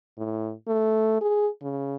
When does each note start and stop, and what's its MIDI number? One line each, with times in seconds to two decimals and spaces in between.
0.18 0.52 45
0.68 1.18 57
1.21 1.48 68
1.62 1.96 49